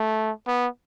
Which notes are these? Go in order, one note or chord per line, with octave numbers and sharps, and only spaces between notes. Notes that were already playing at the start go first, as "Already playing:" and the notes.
Already playing: A3
B3